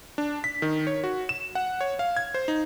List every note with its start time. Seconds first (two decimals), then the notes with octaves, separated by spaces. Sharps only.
0.18 D4
0.44 B6
0.62 D#3
0.87 C#5
1.04 F#4
1.29 E7
1.55 F#5
1.81 C#5
1.99 F5
2.17 G#6
2.34 C5
2.48 D#4